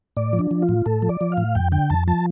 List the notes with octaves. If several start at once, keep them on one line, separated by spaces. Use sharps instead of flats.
A2 D5
F3
D4
F3
F4
A2
A2 A4
F3
D5
F3
F5
A2
F2 G5
D3 G5
F2 A5
F3 A5